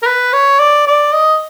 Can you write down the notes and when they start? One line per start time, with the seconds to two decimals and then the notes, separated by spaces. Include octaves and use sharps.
0.03 A#4
0.07 B4
0.33 C#5
0.59 D5
0.87 D5
1.13 D#5